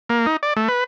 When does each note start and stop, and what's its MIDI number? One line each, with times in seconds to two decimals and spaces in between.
0.09 0.26 58
0.26 0.37 63
0.43 0.54 74
0.56 0.68 57
0.68 0.84 71